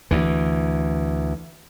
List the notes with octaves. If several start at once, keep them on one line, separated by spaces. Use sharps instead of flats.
D2 E3